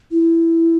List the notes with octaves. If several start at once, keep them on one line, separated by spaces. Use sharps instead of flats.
E4